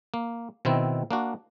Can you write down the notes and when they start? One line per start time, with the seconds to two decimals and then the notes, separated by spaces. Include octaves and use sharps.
0.14 A#3
0.65 B2 D#3 C4 E4
1.11 A#3 D4 F#4